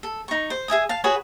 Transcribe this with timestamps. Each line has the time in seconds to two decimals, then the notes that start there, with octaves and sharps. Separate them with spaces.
0.03 A4
0.28 D#4 C#6
0.50 C5
0.68 G#4 E5 G#5 D#6
0.89 F5 A5
1.04 F#4 G#4 B4 C#5